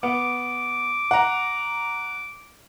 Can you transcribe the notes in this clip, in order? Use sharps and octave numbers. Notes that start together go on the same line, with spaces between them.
B3 D6
F#5 A#5